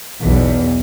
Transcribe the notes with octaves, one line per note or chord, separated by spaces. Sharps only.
B1 E2